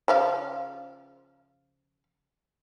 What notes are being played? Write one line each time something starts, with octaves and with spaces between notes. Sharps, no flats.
C#3 F3 F5